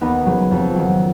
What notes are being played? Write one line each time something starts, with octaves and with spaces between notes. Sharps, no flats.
D#2 B3 D#4
C#3 F#3
F2
D#3 F#3